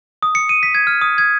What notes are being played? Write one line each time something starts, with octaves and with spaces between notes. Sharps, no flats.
D#6
C#7
D#7
B6
G#6
F6
D#6
G#6